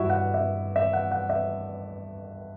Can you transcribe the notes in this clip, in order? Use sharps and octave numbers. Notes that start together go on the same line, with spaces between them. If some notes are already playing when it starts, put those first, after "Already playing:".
Already playing: G2 E4 F#4 E5
F#5
E5
E5
F#5
F#5
E5